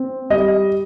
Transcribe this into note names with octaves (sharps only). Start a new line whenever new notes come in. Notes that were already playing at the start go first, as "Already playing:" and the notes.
Already playing: C4
G3 D#5